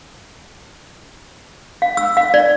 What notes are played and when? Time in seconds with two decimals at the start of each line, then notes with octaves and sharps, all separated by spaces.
1.82 F5
1.97 E6
2.17 F5
2.34 D5